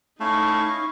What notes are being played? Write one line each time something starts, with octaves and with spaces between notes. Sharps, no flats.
A3 C#4 D#4 E4 F5 C#6